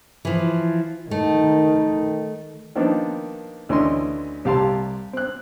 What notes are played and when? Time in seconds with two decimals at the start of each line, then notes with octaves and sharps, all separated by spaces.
0.25 E3 F3
1.11 D#3 A3
2.76 D#3 F3 A#3 B3 D4 D#4
3.69 D2 E3 C#4 B4 D#5 C6
4.45 C2 G4 F5 A5 C6
5.13 C4 F#6